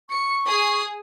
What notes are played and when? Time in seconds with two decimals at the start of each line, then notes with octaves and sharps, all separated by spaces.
0.10 C#6 C#7
0.46 G#4 D#6 C7